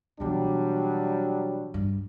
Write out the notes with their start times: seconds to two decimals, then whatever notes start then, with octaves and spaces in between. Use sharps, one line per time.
0.20 B2 E3 F#3 G3 D4
1.74 G2